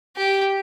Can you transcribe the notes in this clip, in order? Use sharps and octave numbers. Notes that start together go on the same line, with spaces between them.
G4